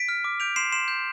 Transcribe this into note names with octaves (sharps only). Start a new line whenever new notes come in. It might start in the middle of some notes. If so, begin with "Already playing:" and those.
Already playing: B6 D7
F6
D6
G6 D7 F7
C6 C7 E7
C6 C7 E7
G6